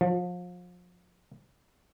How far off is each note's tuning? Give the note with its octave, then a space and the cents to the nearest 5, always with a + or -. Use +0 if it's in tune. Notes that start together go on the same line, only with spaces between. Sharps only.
F3 +35